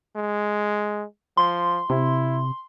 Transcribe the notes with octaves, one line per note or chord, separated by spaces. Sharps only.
G#3
F3 C6
C3 E4